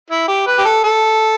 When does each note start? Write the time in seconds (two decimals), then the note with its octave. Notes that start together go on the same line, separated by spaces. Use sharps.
0.10 E4
0.28 G4
0.46 B4
0.58 G4
0.65 A4
0.84 A4